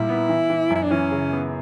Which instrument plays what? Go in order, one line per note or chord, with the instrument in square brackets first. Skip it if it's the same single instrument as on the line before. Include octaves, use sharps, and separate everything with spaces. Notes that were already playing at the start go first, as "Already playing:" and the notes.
Already playing: [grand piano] A#2 G3 [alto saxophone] E4
[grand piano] B3
E3
E3
[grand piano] F#2 [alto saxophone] E4
[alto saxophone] D4
[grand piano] E3 [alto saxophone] C#4
[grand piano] C#3
B3